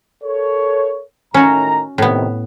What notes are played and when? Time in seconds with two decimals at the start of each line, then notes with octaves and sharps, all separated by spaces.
0.23 A4 A#4 C#5
1.34 A2 D#3 C#4 F#4 A#5
1.98 A2 C3 D#3 B3